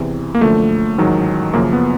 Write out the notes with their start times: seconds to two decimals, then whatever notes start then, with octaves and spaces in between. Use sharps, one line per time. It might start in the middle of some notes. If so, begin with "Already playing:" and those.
Already playing: E2 C3 E3
0.35 A#3
0.41 F#2 D3 F3 A3
0.98 A1 G#2 D#3 F#3
1.53 F#2 C#3 F3 A#3
1.73 B3